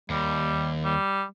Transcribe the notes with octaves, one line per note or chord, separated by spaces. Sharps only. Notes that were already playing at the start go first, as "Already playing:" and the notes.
D#2 G3
G3